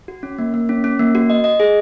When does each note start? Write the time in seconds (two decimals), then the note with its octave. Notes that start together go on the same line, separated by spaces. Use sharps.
0.08 F#4
0.23 C#4
0.38 A#3
0.54 A#3
0.69 C#4
0.84 C#4
0.99 A#3
1.15 F#4
1.30 D#5
1.44 D#5
1.60 G#4